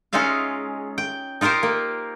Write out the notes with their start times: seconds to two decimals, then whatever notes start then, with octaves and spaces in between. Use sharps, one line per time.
0.13 G#3 C#4 D#4 F4 E5 F5
0.98 G5
1.41 D#4 F4 G4 A#4 C5
1.63 A#3